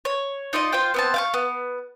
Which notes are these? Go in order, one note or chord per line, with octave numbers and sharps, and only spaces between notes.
C#5
D#4 F4 D5 D#5
F4 C5 F5 G5
B3 C4 A5
F5 G5 C#6
B3